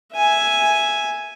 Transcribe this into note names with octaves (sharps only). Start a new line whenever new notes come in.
E5 G#5